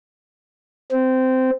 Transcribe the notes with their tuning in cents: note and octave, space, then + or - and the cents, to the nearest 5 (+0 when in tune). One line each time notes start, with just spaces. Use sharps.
C4 -15